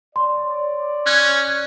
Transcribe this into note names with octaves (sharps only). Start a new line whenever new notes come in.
C#5 D5 C6
C#4 F#6 G#6